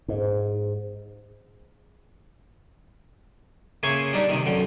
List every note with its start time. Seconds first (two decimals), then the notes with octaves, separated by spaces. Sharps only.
0.08 G#2
3.83 C#3 A#3 E5 G#5 C6 C#6
4.13 G3 D4 D#4 G4
4.29 C3 D#3
4.46 F#2 D3 G5